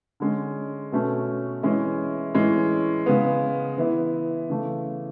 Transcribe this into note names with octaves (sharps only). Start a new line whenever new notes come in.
D3 G#3 C#4
B2 A3 C#4
E3 G#3 C#4 E4
A2 E3 G#3 C#4
C#3 G#3 B3
E3 B3 E4
C#3 E3 A3